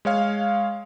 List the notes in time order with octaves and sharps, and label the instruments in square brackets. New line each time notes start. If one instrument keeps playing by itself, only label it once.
[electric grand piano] G#3 C#5 F5